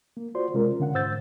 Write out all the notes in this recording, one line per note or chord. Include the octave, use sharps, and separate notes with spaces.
A#3
F4 F#4 C5 D5 C6
C3 G#3 C#4 F4 A#4
D3 C#4 F5 F#5
G#2 C5 E6 G6 A6